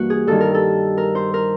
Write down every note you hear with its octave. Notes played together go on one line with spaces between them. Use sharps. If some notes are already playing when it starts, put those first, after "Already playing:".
Already playing: G2 E3 G3 A#3 F#4
G#4
G2 D#3 G3 A4
A#4
A4
A#4
C5
A#4